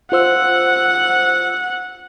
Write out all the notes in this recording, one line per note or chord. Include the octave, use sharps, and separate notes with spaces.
F4 C5 F#5 E6